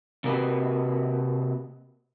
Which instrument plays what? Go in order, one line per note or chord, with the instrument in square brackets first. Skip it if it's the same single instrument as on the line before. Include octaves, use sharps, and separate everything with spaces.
[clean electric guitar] C3 A#3 F#4 G4 B4